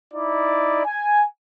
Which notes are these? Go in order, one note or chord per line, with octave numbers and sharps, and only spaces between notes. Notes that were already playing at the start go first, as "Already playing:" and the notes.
D#4 E4 D5
G#5